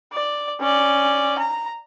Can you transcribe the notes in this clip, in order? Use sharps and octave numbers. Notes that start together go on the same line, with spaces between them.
D5
C#4 D5
A#5